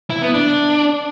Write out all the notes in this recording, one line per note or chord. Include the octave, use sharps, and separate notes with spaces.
E4
B3
D4